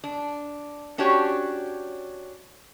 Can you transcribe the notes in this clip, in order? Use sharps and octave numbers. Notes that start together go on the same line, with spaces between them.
D4
C#4 D4 F#4 G4 C#5